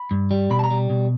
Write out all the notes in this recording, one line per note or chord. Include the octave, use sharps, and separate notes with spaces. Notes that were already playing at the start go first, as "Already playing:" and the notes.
Already playing: B5
G2
G3
B2 B5
A5
A#5
G3
B2